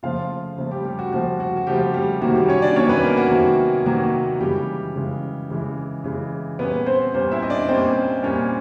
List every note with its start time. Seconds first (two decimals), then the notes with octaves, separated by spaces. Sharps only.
0.03 C#3 F3 A3 F4 F5
0.57 C#3 F3 A3
0.71 G3 G4
0.85 G3 G4
0.99 F#4
1.12 C#3 F3 A3 F#4
1.40 F#4
1.57 F#4
1.67 C#3 F3 G3 A3 G4
1.94 G3 G4
2.21 C3 D#3 F#3 A#3 F#4
2.35 G3 G4
2.48 C#4 C#5
2.62 D4 D5
2.76 C3 D#3 F#3 A#3 C#4 C#5
2.89 B3 B4
3.03 A#3 A#4
3.17 F#4
3.31 C3 D#3 F#3 A#3
3.85 C3 D#3 F#3 A#3 F#4
4.40 C#3 E3 G3 G#3 G4
4.95 C#3 E3 G#3
5.50 C#3 E3 G#3
6.04 C#3 E3 G#3
6.59 A#2 G3 A#3 B3 C#4 B4
6.86 C4 C5
7.13 A#2 G3 A#3 C4 C#4 C5
7.31 E4 E5
7.43 D#5
7.50 D4 D5
7.68 A#2 G3 A#3 C4 C#4 C5
8.23 A#2 G3 A#3 C#4